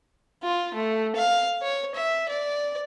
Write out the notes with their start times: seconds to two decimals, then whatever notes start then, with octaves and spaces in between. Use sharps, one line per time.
0.43 F4
0.74 A3
1.16 F5
1.62 C#5
1.95 E5
2.29 D5